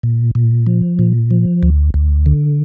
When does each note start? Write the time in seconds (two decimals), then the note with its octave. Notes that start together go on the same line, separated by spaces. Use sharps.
0.03 A#2
0.35 A#2
0.66 F3
0.99 A#2
1.31 F3
1.63 D2
1.94 D2
2.26 D3